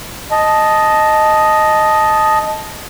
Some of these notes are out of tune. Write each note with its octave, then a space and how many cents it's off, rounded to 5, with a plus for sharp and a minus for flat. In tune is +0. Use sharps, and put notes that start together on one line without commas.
D#5 +0 A5 -10